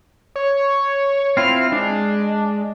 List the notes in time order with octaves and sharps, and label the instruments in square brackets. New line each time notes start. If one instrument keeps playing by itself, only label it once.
[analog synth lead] C#5
[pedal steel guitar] C4 E4 F4 [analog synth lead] F6
[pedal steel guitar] G#3 [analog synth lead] D4